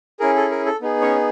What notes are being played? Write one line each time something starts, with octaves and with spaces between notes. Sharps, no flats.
C#4 E4 G#4 A#4
A4
A#4
A4
B3 D#4 G#4
C#4 C#5